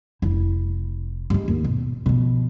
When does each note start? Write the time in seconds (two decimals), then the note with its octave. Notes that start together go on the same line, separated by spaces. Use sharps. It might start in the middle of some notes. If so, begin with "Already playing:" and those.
0.22 F1 E4
1.30 G2 G#3
1.48 D#2
1.64 B2
2.06 B2 F3